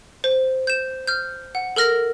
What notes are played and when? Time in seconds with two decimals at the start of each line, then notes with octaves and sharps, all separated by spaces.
0.24 C5
0.67 G6 E7
1.07 F6 G6
1.55 F#5
1.76 A4 A#4 F6 A#6